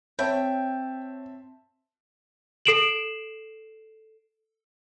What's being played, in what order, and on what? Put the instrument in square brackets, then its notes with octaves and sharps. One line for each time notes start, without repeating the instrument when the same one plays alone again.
[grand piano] C4 E5 A5 [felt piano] C#5 [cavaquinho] G5
[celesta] A4 C7 D7 E7 F#7